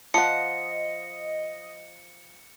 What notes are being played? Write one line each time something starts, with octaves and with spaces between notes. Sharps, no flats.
F3 D#5 F#5 A5 C#7